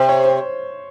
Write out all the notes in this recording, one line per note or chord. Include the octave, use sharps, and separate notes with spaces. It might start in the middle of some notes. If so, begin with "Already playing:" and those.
Already playing: C3 C5
C#5
C5